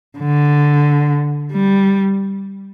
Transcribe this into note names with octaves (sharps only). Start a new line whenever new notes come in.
D3
G3